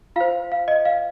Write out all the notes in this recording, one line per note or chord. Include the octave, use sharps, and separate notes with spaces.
F4 C5 F5
F5
D#5
F5